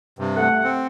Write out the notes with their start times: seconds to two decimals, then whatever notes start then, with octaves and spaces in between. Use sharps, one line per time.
0.19 G2 C3
0.36 A3 F#5
0.64 C4